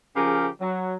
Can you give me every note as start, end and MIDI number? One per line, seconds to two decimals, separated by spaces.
0.16 0.47 49
0.16 0.47 53
0.16 0.47 67
0.16 0.47 68
0.16 0.47 70
0.61 0.96 54